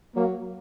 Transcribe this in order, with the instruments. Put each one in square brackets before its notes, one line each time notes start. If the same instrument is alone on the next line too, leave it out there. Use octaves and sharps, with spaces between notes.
[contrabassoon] F#3 [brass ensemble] A#3